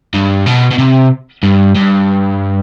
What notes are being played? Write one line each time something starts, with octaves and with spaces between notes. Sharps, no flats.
G2
B2
B2
C3
G2
G2